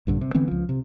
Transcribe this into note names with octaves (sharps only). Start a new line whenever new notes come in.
A#1 G2 D3
C3
D3 E3 B3 C4
C#2 F3
C3